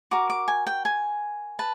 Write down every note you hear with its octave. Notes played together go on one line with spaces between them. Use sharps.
F#4 A#4 D6
D6
G#5
G5
G#5
B4 A5